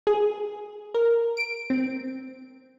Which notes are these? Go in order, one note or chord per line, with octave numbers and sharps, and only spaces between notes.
G#4
A#4
D7
C4